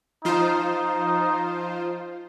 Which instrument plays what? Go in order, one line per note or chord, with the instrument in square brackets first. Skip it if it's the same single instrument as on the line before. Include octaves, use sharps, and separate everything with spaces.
[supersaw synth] F3 F4 C5 [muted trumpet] D#4